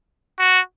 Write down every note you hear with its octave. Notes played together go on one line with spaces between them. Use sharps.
F#4